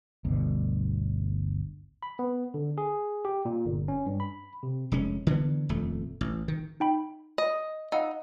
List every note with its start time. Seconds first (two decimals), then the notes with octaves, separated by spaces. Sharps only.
0.25 G1 D2 B2 D3
2.03 B5
2.19 B3
2.54 D3
2.78 G#4
3.25 G4
3.45 A#2
3.66 G1
3.88 C#4
4.06 G2
4.20 B5
4.63 C3
4.92 F1 G#3 C#4
5.27 D3 E3 A3 B3
5.69 D#1 F2 A3
6.21 A1
6.48 D#3
6.80 D#4 G5 B5
7.38 D#5
7.92 D#4 F5 F#5 E6